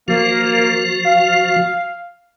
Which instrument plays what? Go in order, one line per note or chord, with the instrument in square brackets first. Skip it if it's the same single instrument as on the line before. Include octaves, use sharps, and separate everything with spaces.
[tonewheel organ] F3 F#4 [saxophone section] A#3
[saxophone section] F5